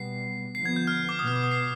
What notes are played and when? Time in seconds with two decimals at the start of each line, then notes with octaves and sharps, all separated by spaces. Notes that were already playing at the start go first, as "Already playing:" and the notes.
Already playing: B2 G3 B3 C7
0.55 D3 F3 B3 C7
0.65 G#6
0.76 G6
0.87 F6
1.09 D6
1.19 B2 B3 D#6
1.27 F6
1.36 D6
1.44 D#6
1.52 C7